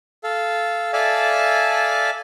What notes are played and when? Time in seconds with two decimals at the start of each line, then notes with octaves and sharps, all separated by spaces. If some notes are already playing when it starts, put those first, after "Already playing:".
0.24 A4 F5
0.93 A4 D5 E5 F5 G#5 A5